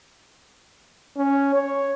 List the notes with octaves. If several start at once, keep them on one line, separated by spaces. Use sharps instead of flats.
C#4
C#5